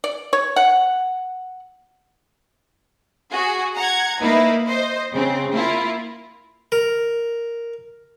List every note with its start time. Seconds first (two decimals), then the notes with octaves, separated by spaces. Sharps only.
0.04 D5
0.33 C#5
0.56 F#5
3.30 F#4 G#4
3.75 F#5 A#5 G#6
4.21 A#3 D#4 E4 B4
4.67 C5 D#5
5.12 C#3 C4
5.54 A#3 E4 F4
6.72 A#4